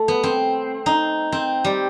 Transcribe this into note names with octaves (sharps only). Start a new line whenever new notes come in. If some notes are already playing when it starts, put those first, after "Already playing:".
Already playing: A3
B3
C4
D#4
C4
G3